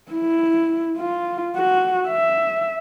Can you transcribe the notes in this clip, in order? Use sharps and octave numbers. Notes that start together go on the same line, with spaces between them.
E4
F4
F#4
E5